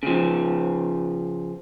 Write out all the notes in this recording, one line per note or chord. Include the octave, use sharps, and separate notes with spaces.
C#3 F3